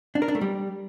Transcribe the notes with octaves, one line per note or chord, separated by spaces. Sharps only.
D4
A#4
D4
A3
G3